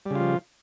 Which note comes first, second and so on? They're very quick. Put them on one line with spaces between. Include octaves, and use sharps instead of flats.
G3 C#3 F4 F3